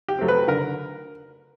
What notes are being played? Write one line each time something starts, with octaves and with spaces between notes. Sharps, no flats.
G4
F#3 A3 C4
B4
D3 A#4